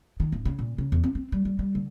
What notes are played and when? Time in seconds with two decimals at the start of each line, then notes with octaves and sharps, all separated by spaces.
0.20 D#3
0.32 D1
0.45 C#3
0.59 A#2
0.78 C#3
0.92 E2
1.04 C4
1.15 C4
1.32 G3
1.45 G3
1.59 G3
1.75 D3